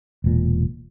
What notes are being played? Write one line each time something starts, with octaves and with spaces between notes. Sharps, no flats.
E1 A#2